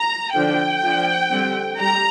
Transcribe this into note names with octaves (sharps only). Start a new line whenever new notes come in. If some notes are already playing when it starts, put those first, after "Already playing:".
Already playing: A#5
D3 F3 D4 G5
F3 D4
D3 G3 C4
G3 A#5